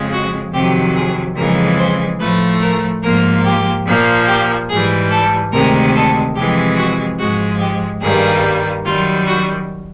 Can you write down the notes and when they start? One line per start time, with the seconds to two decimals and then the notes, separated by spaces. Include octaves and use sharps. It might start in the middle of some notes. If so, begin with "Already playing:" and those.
Already playing: F2 C#3 F3 G#3
0.12 F#4
0.53 F2 C3 D#3 F#3 G4
0.95 G#4
1.36 F2 C#3 E3 G#3 A#4
1.78 C5
2.19 A2 F3 A3 B4
2.61 A#4
3.02 G#2 F3 A#3 A#4
3.44 G4
3.86 A#2 F3 A#3
4.27 G4
4.69 G#2 E3 G3 G#4
5.10 A4
5.52 D2 C3 D#3 G#3 A#4
5.94 A4
6.35 F2 C3 E3 G#3 G4
6.77 F#4
7.18 G#2 F3 G#3 F#4
7.60 G4
8.02 G2 D#3 G3 A#3 G#4
8.85 F#2 D#3 G3 F4
9.27 F#4